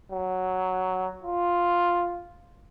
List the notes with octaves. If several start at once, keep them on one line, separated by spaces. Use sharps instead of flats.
F#3
F4